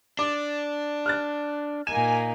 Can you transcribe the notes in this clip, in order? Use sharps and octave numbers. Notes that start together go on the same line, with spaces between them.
D4 D6
F6 F#6 A6
A#2 A#3 D#4 G#5 E7